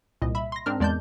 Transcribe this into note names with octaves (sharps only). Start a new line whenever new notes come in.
C2 A#2 D#5
E5 B5
C6 A#6
G#2 C4 D4 A#4 F6
E2 G#3 D5 A5 G6